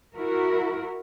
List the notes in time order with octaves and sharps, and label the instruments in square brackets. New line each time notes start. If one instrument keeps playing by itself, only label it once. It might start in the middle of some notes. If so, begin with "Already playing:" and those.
[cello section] E4 F#4 A#4